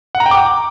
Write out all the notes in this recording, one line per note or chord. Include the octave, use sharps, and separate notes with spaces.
F#5
A#5
G5
D6